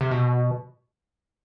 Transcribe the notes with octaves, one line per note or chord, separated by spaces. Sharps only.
C3
B2